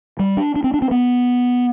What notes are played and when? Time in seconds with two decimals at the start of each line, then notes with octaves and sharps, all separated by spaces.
0.19 G3
0.37 D4
0.56 D4
0.64 C4
0.74 D4
0.82 C4
0.91 B3